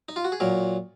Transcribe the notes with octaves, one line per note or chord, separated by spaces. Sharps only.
D#4
F4
F#4
G#4
A#2 F#3 A#4